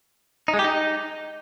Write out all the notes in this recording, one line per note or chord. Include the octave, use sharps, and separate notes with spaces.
D#4
G#3
G4
D#4